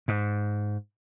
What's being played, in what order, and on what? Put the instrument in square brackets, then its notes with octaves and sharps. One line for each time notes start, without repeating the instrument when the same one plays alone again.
[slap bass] G#2